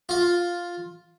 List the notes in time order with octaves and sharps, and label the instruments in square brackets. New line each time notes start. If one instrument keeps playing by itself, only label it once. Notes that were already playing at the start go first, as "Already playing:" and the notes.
[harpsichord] F4